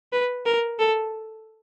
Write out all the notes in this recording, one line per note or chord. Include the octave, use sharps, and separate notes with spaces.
B4
A#4
A4